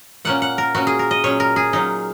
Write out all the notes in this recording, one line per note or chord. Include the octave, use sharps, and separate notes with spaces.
A#2 A#3 C#4 F#5
F#5
A#4
A#2 A#3 C#4 F#4
G#4
A#4
D#5
A#2 F#3 C#4 C#5
A#4
G#4
A#2 F#3 C#4 D#4